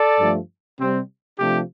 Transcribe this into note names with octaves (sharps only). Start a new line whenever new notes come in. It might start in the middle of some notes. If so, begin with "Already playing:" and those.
Already playing: A4 D5
G2 F3 A3
C3 G3 C4
C3 F3 A3 D4 G4